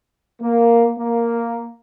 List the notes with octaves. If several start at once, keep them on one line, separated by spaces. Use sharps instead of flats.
A#3
A#3